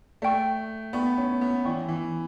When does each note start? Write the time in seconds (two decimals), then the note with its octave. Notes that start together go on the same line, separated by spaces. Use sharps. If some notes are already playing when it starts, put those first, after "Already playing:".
0.22 A3 D5 G5 C#6
0.93 B3 D5 G5 C#6
1.18 C#4
1.41 B3
1.65 E3 D5 G5 C#6
1.88 E3